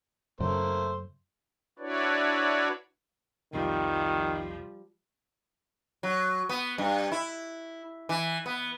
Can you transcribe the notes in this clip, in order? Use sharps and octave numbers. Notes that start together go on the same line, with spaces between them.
F#2 C#3 A3 A#3 C5
D4 E4 F#4 B4 C#5 D5
C2 F2 C3 D#3 F3 G3
F#3
B3
G2
E4
E3
B3